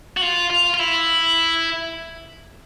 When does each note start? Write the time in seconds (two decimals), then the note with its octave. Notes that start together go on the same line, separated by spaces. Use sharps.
0.17 F#4
0.22 F4
0.50 F4
0.74 F4
0.79 E4